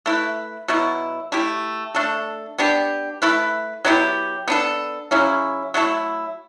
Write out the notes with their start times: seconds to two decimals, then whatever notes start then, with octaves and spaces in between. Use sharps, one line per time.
0.06 A3 E4 B4
0.68 B2 F#3 B3 E4
1.32 A3 E4 G4
1.95 A3 D4 A4
2.58 B3 D4 G4
3.22 A3 E4 B4
3.85 F#3 B3 E4 G4
4.48 B3 D4 A4
5.11 C#3 F#3 C#4 E4
5.74 F#3 A3 E4 A4